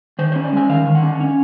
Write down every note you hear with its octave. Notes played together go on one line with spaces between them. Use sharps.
D#3 C5
C5
C#4
D5
G#3 G#5
D#3 F5
D#3
F#5
C#4
C#4